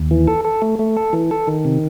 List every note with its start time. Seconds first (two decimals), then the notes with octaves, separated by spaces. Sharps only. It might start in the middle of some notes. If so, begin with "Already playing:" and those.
Already playing: D#2
0.11 E3
0.28 A4
0.45 A4
0.62 A3
0.79 A3
0.97 A4
1.13 E3
1.31 A4
1.47 D#3
1.65 C3